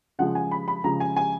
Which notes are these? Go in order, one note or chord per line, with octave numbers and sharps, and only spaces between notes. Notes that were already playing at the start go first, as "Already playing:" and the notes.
C#3 F3 G#3 F#5
G#5
B5
B5
C#3 F3 G#3 A#5
G#5
G#5